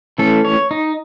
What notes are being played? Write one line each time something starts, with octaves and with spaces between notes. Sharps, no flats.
E3 A3 C#4 A4
C#5
D#4